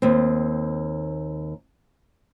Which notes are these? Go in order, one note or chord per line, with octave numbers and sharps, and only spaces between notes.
D#2 C4